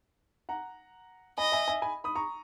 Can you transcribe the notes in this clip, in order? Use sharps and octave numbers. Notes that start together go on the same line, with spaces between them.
F#5 A#5
D#5 G#5 B5
E5 G#5
E5 G#5
G#5 B5
B5 D#6
A#5 C#6